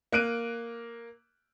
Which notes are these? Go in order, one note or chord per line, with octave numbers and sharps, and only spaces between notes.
A#3 F#6 D7 D#7